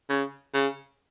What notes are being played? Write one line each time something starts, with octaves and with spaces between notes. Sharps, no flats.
C#3
C#3